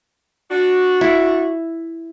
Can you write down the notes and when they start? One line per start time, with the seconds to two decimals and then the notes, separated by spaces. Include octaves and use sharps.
0.50 D4 F#4
1.01 E4